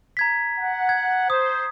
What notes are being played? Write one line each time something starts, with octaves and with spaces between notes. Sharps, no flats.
A#5 G#6 B6
F#5
G#6
C5 D#6